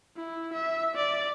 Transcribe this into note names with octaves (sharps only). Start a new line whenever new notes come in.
E4
E5
D5